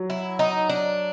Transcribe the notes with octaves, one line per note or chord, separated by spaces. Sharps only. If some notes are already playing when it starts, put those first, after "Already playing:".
Already playing: F#3
E4
D#4
D4